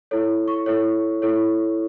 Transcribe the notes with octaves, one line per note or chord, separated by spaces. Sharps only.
E4 A4 C#5
C#6
E4 A4 C#5
E4 A4 C#5